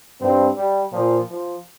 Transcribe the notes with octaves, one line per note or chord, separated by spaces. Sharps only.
G2 C4
G3
A#2 F3
F3